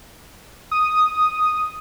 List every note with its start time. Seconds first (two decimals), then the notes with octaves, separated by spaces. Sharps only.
0.71 D#6